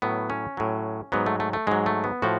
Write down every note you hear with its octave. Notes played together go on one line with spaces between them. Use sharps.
A2 F#3 B3
C#4
A2 F#3
G#2 F#3 B3
A3
A3
A3
G#2 F#3 G#3
A3
B3
A2 F3 F#4